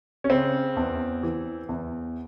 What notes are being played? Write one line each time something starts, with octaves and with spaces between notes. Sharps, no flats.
C#4
C#3 C4
E2
E3
E2